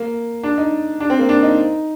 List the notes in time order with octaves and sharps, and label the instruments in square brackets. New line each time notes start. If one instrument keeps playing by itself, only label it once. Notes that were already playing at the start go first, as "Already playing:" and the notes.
Already playing: [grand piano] A#3
D4
D#4
D4
C4
A#3
D4
D#4